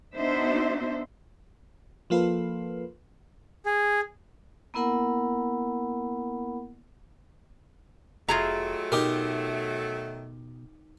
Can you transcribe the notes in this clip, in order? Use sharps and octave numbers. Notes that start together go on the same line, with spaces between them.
B3 D4 D#4 F#4 C5 E5
F3 A#3 F4 A4 B4
G#4
A#3 B3 E4 A#4 F#5 B5
F1 D#3 F#3 A3 F4 G#4 A#5
B2 D#4 G4 A#4